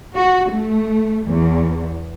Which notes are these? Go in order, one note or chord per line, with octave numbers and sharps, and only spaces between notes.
F#4
A3
E2